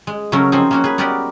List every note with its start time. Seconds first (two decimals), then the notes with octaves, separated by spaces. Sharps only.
0.07 G#3
0.32 C#3 F#3 A3 C#4 A#4
0.52 F3 C4 D#4 G#4
0.71 A#3 C#4 F#4
0.84 G#4 B4
0.98 B3 F#4 G4 A#4 D5 D#5